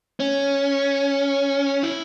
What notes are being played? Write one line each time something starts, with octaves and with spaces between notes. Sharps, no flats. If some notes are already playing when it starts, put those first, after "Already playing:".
C#4
E4